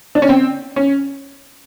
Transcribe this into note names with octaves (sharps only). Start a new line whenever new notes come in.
D4
C#4
C4
C#4